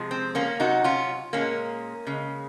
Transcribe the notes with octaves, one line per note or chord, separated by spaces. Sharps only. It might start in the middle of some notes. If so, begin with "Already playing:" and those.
Already playing: C3 F3 G#3
C4
A#3 C#4
C3 F#3 D#4 F#4
C#4 F4
A#2 G#3 A#3 C#4
C#3 G#3